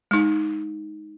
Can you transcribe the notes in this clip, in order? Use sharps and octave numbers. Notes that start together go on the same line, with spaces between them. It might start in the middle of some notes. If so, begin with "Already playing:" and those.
G#3 D#4